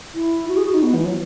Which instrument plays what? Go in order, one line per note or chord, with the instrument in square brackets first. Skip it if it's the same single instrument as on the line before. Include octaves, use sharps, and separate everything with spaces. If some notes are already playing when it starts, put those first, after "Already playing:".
[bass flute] E4
F#4
G#4
F#4
D#4
B3
E3
F#3